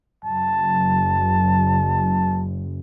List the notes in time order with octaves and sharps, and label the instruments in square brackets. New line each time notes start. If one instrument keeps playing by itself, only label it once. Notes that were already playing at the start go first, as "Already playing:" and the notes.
[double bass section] F#1 [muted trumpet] A5